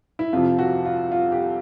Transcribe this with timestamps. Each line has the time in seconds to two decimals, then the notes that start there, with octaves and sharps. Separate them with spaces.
0.19 E4
0.33 F2 C3 F3 F4
0.59 F#4
0.86 F4
1.12 F4
1.32 G4